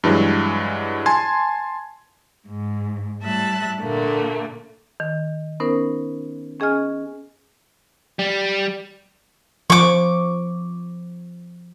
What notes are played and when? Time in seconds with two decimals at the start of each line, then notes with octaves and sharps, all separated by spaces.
0.04 G2 E3 F#3 G#3
1.06 G#5 A5 C6 G#6
2.47 G#2
3.21 A2 G3 E5 A5 F#6
3.81 A#2 D3 A3 A#3
5.00 D#3
5.60 B3 C#4 D#4 A#4 C5
6.60 C#4 G#4 D#5 G#5 F6
8.19 G3
9.70 F3 C#6 D6